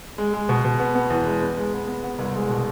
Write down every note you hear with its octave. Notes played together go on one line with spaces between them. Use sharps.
G#3
G#3
B2
B2
B3
B3
E2
G#3
B3
G#3
B3
B3
B3
C2
G#3
B2